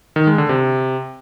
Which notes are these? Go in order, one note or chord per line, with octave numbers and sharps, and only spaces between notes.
D#3
G#3
D3
C3